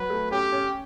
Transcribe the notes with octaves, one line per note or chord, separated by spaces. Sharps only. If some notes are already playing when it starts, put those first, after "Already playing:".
Already playing: F#3 B4
A3
C#4 G4
C#4